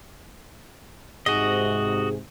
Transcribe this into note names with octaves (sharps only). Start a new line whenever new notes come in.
G#2 C3 F#4 G#4 D#5